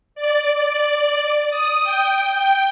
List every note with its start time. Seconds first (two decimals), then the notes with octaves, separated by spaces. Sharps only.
0.15 D5
1.49 D#6
1.83 G5